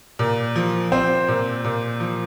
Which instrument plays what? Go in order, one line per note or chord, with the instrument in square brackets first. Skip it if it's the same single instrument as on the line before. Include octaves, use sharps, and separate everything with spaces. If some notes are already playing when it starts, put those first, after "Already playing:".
[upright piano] A#2
F3
[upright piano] C4 [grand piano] C5
[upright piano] A#2
A#2
F3